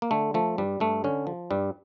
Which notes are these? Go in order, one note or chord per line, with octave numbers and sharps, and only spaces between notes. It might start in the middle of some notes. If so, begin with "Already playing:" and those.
A#3
D3 A3
F3 A3
G2 G3
G2 A3
D3 C#4
F3
G2 G3